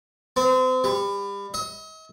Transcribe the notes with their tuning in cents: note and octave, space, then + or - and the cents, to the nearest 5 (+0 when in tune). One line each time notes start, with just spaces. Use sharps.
C4 -35
G3 +30
D#5 +40